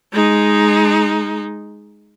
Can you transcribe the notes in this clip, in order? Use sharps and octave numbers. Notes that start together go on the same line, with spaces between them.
G#3 D#4